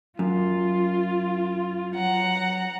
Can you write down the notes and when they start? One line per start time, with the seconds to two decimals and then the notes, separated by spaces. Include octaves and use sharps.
0.19 F#2 F4
1.95 F#3 F#5 A#5